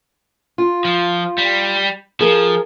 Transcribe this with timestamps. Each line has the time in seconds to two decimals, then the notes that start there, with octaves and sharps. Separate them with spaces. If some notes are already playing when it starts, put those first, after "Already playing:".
0.58 F4
0.85 F3
1.38 G3
2.21 F3 G#4 A#4